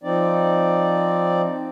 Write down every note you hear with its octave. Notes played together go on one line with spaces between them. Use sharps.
F3 C4 D#4 D5